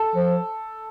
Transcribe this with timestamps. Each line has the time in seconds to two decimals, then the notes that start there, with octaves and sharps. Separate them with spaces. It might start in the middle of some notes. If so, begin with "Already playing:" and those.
Already playing: A4
0.16 F3